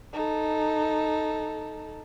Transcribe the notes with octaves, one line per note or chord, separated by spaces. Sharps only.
D#4 A4